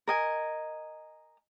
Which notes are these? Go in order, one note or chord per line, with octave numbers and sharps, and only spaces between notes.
A#4 D#5 G#5